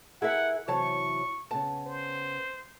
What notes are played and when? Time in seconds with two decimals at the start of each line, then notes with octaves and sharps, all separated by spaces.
0.22 E4 G#4 A#4 E5 F#5
0.68 C3 E3 F#3 C#5 A5 C#6
1.51 C#3 B3 A5
1.86 C5